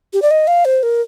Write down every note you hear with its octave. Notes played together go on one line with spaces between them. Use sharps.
G4
D5
D#5
F5
C5
A#4